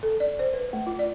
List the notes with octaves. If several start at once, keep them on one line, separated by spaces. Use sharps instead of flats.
A4
D5
C5
B4
A3
F4
D5